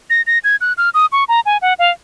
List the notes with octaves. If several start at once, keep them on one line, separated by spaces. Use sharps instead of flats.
A#6
A#6
G#6
F#6
F6
D#6
C#6
A#5
G#5
F#5
F5